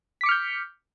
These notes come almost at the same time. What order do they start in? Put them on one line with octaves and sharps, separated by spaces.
B6 D6 C#7 F6 G6